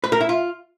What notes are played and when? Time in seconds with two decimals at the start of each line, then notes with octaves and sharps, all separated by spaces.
0.04 B4
0.12 A#4
0.21 E4
0.29 F4